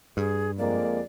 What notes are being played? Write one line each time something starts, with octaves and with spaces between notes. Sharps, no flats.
G2 G#4
F2 G#3 A#3 D5